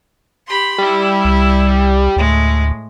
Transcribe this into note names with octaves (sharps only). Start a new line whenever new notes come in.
G4 B5 C6
G3 E4
C2
D2 A2 G#3